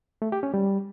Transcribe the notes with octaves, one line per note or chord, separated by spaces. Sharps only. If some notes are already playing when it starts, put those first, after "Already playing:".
A3
G4
C#4
G3